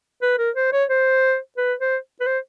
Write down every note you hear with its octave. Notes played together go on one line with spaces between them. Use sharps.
B4
A#4
C5
C#5
C5
B4
C5
B4
C5